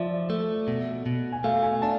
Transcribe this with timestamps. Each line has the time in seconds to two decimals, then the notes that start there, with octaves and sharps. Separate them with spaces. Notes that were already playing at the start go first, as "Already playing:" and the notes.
Already playing: F3 D5 E5
0.30 A3
0.68 B2
1.06 B2
1.32 G#5
1.44 A3 F5
1.62 G#5
1.82 D4 A5